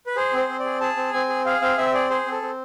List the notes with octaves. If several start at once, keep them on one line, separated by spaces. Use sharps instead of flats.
B4
G#4 C5
C4 C5
C4
D5
G#4
G#4 A5
C4
C4 G#5
G#4
G#4 F5
C4 F5
C4 E5
G#4 D5
G#4 C5
C4 A4
C4